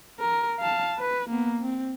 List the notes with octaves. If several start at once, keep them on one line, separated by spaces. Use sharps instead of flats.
A#4
F5 A5
B4
A#3 B3
C4